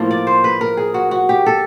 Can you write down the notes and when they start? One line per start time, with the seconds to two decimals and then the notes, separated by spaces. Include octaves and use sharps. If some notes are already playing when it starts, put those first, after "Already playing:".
Already playing: A2 F3 A#3
0.11 D5
0.27 C5
0.44 B4
0.61 A#4
0.77 G#4
0.94 F#4
1.11 F#4
1.29 G4
1.46 A4